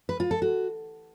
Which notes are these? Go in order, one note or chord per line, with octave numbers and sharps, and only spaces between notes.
B4
F4
A4
F#4